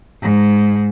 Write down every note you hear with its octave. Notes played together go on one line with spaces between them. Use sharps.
G#2